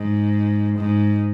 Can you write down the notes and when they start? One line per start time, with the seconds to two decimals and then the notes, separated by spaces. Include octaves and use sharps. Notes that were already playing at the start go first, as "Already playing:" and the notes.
Already playing: G#2
0.78 G#2